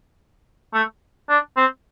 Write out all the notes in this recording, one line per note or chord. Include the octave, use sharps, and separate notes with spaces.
A3
D4
C4